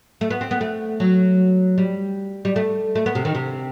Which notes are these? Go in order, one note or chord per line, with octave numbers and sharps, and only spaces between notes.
A3
B3
C4
B3
A3
F#3
G3
G3
A3
A3
B3
C3
D#3
C3